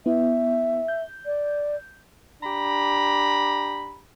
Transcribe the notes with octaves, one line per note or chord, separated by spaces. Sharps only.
B3 E4 E5
G6
D5
D4 G4 A#5 B5